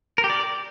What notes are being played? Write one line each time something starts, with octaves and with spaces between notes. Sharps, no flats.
A#4
G4
D5